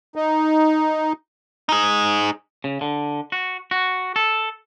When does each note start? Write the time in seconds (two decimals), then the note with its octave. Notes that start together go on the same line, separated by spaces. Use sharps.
0.16 D#4
1.69 D#4 G#4
2.64 C#3
2.81 D3
3.32 F#4
3.71 F#4
4.16 A4